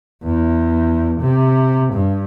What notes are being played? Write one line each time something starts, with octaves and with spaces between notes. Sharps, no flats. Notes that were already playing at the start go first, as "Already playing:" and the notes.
E2
C3
G2